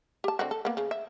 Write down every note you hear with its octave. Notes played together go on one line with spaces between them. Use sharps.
G4 A5
D3 C4 F#4
A4
A#3 B3
C#3
E5